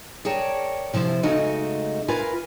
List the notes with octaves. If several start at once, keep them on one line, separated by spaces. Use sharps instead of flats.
G#4 A#4 C#5 D5 G5 A5
C3 F3 E4 C5
C#3 G#3 A3 D#4 F#4 D#5
F4 A#4 B4 G#5